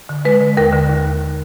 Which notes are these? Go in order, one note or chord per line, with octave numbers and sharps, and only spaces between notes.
D3
G#3 B4
D3
D#2 A#4
D3
D#2
D#2